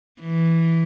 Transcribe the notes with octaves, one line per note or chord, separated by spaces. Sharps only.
E3